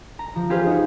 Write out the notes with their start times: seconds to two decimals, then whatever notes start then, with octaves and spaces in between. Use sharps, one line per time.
0.19 A#5
0.36 F3
0.50 F4 G4 G#4 B4 C5 F5
0.67 D#4 F#4